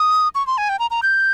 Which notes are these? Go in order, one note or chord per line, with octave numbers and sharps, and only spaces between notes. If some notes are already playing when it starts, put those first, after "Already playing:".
Already playing: D#6
C#6
C6
G#5
G5
A#5
A#5
G6